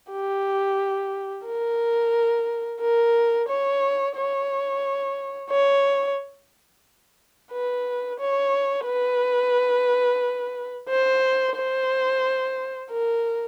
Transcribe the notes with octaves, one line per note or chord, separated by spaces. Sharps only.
G4
A#4
A#4
C#5
C#5
C#5
B4
C#5
B4
C5
C5
A#4